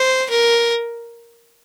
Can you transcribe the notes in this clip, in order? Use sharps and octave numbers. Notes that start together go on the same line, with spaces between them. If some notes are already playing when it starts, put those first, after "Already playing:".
Already playing: C5
A#4